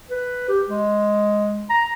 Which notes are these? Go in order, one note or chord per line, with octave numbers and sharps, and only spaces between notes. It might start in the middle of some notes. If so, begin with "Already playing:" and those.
B4
G4
G#3
A#5